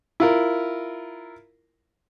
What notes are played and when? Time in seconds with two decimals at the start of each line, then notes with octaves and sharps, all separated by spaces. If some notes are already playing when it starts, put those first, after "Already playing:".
0.20 E4 F4 A#4